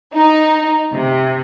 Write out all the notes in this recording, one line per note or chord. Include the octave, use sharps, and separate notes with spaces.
D#4
C3